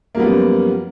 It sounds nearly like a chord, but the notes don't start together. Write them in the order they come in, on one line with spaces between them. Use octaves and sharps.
A#3 G3 B3 F3 F#2